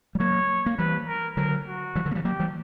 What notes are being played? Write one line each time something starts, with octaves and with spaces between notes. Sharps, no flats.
G3
F#3 A#3 C#5
A#3
E3 G3 B4
A#4
D3 F#3 A#4
F#4
E3 G3
D3 F#3
A#3
E3 G3
F#3 A#3 G4
E3 G3